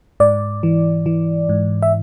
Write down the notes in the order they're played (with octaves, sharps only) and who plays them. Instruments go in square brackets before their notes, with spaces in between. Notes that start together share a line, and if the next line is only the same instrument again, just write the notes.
[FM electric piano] G#2 D5
E3
E3
G#2
E5